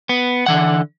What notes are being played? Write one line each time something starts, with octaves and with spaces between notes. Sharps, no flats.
B3
D3 E3 F#5